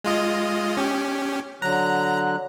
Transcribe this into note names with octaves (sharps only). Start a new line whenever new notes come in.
G#3 F4 D#5
C#4 G4
D3 F#3 A#5 F#6